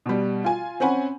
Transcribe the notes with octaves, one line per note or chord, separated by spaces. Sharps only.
B2 G3
F4 G#5
C4 C#4 F#5 G#5 B5